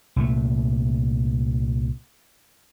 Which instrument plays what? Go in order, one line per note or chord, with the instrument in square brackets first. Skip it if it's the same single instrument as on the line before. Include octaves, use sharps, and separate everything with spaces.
[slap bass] C2 A#2 A3